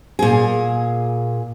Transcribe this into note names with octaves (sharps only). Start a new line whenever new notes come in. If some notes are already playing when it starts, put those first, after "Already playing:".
A#2 G#4